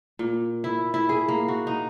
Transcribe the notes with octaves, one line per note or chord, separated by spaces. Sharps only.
A#2
E4
E4
G#4
A#3
F#4
D#4